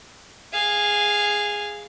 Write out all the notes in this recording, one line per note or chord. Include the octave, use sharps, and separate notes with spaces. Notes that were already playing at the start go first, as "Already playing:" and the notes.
G#4 F5